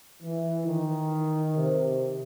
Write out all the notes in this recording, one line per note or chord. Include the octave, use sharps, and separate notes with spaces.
E3
D#3
C3